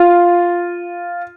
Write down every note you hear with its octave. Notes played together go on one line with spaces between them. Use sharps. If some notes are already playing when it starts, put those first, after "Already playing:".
Already playing: F4